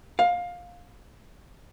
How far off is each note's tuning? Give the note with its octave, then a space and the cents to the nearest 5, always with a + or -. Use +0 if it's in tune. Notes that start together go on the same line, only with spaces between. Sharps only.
F5 +20